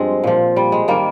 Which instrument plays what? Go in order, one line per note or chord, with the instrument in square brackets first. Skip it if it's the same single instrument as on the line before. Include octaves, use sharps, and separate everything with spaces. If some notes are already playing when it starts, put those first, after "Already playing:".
Already playing: [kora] G2 F3 G#3 C4
A#2 F3
G3
G#3
D#3 G3 A#3